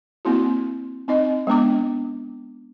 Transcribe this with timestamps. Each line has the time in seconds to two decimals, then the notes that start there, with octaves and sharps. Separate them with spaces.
0.25 A#3 C4 E4 F#4
1.08 C4 D#4 D#5
1.47 G#3 B3 D4 D6